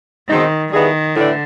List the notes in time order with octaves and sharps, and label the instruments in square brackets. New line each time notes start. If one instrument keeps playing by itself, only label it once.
[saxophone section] B2 G#3 C4 D#4 [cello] D#3
[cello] D#3 [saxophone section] G3 B3 E4 G#4
[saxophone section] A2 E3 A3 D4 [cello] D3